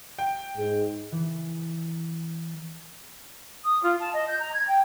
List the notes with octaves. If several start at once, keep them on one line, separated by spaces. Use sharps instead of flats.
G5
G#2
E3
D#6
F4
A5
D#5
G6
A#5
G#6
G5